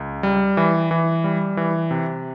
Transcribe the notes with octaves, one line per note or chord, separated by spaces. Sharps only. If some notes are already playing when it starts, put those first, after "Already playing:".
Already playing: C#2
G3
E3
E3
G3
E3
C3